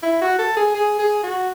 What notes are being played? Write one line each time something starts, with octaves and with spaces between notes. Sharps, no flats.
E4
F#4
A4
G#4
G#4
G#4
F#4